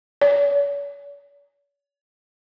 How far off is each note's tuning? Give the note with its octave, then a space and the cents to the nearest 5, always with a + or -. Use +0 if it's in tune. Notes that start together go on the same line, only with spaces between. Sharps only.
C#5 +45